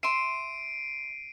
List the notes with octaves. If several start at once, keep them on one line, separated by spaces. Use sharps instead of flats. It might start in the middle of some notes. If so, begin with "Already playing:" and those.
E5 C6 C7 D7 D#7